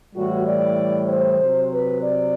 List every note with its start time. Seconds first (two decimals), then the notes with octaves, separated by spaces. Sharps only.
0.15 A2 E3 G3 F#4
0.46 D5
1.08 C5
1.40 C3 F#3 C4
1.71 B4
2.02 D5